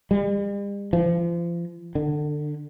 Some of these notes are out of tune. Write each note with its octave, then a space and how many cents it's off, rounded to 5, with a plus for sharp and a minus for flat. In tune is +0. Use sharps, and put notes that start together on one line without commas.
G3 +45
F3 -35
D3 +25